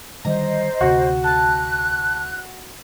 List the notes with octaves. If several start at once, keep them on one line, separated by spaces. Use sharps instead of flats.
D3 D#3 G3 C5 D#5 A#5
D2 C3 F#4
A4 A5 F#6